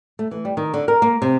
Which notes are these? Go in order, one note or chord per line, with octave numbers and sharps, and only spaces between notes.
A3
E3
G3
D#3
D3
A#4
A#3
C3